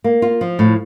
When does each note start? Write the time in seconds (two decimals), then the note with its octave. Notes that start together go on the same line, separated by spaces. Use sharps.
0.04 A#3
0.22 F4
0.41 F3
0.59 A2